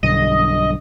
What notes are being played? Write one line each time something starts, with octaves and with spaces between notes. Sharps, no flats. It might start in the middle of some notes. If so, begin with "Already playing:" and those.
B1 G2 D3 D#5